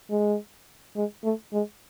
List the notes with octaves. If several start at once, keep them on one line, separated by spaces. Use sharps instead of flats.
G#3
G#3
A3
G#3